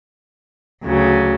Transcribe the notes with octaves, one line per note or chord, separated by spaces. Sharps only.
D2 C#3 F#3